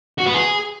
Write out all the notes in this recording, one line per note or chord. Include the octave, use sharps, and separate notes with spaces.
F#4
B3
G#4